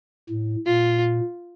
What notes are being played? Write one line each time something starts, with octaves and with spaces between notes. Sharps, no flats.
A2
A#2 F4